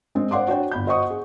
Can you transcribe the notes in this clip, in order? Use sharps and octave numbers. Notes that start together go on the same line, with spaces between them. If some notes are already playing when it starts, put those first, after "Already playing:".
G#3 C4
C5 D5 F#5 C6 D6
D4 F#4 C#5 G5
G1 B5 G6
F#4 C5 D#5 F#5 C#6 D#6
G#4